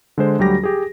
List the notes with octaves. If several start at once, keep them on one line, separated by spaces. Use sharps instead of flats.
D3 G#3 C5
D2 F#3 G3 G4 A#6
G4 G#4